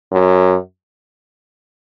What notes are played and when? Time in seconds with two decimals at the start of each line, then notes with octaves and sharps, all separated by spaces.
0.12 F#2